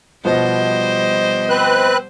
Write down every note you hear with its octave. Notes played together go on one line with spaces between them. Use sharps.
B2 F3 G3 B3 C5 D#5
C4 B4 F#6